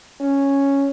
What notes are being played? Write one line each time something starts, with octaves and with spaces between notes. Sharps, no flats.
C#4